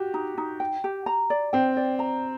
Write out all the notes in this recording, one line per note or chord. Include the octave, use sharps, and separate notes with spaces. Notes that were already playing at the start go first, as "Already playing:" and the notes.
Already playing: F#4 G4
D#4
D#4
G5
G4
A#5
D5
C4 G5
D5
A#5